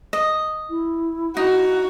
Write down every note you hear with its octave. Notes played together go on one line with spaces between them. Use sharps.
D#5
E4
D#4 F#4